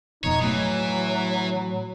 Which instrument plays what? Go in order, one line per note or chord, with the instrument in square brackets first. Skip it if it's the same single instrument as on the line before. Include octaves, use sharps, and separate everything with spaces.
[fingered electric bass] D1 F2 B2 [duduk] D#4 [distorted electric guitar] C#5
[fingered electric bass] A2 A3 [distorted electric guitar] E3 [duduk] F#3